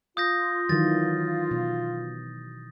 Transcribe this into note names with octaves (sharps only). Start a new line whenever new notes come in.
F4 D#6 G6 A#6
D#3 E3 F#3 A6
B2